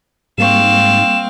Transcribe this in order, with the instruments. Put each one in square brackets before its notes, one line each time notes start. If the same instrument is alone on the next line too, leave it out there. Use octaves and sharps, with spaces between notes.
[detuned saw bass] G#2 [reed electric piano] G3 A#3 C#6 [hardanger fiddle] C4 F5 [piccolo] E7